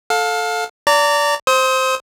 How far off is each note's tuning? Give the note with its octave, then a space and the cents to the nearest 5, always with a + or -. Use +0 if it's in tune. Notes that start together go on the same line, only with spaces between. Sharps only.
A4 +0 F5 +25
D5 -25 A#5 -35
C5 +0 D#6 +40